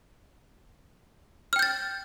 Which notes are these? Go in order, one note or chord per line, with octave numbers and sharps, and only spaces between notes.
G5 F6 G6 A6